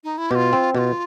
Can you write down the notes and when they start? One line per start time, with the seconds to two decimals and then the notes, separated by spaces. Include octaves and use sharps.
0.04 D#4
0.18 E4
0.31 B2 G4
0.35 F4
0.53 C4
0.74 B2 F4 G4